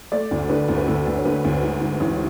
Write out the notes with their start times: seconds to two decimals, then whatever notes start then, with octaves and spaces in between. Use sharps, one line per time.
0.12 A3 D5
0.31 D2
0.50 D3 B4
0.69 D2
0.77 B4
0.87 D2 A4
1.07 D2
1.17 C#5
1.25 D3 B4
1.45 D2
1.62 G#2
1.81 G#2
2.00 A1